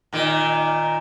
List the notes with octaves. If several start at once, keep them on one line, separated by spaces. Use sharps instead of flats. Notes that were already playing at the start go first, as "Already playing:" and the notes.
A#2 D#3